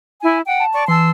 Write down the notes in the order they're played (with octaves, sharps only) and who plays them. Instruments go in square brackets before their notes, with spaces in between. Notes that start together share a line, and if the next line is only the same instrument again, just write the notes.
[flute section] E4 G#5
F#5 G5
[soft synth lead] A5
[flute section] D5 C#6
[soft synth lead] E3 [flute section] A5 C6 E6